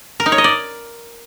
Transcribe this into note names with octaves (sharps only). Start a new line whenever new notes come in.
A#4
D#4
C#5
D#5
D5